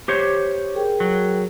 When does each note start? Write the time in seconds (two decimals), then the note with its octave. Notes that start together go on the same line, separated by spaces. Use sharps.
0.08 G4 C5 C#5
0.74 G#4 A#4 G5
1.00 F#3